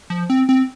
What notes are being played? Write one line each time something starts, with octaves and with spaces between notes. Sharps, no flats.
F3
C4
C4